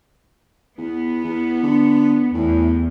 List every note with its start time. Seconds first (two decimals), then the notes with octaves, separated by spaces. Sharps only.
0.78 E2 B3
1.24 E2
1.63 D3
2.34 E2 A2